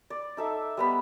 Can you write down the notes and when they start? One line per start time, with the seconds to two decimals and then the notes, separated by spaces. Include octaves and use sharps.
0.10 D5
0.37 D#4 A4 E5
0.77 G3 B3 B5